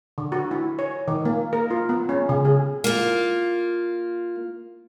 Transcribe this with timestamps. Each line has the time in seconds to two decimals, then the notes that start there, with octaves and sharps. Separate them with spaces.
0.18 D3
0.32 F#4
0.51 E4
0.79 C#5
1.08 D#3
1.25 A#3
1.53 A#4
1.71 F4
1.89 B3
2.09 C#4
2.29 C#3
2.45 G#4
2.84 A#3 F4